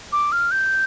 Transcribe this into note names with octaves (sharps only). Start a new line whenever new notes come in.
D6
F6
G6